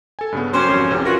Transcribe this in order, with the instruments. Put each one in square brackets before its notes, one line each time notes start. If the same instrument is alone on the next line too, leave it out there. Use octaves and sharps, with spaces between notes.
[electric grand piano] A4 G#5
G2 C#3 B3
[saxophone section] F#2 G4 C5 [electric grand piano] F#3 [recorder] C#4
[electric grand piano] G#1 F2
[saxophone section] E2 [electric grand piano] C3
[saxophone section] E3 F#4 [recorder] F4 [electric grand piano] A#4 A#6